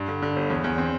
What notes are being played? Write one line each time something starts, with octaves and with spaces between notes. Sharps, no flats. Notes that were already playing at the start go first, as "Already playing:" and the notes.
Already playing: G2
D3
D3
G1
E2
E2
C4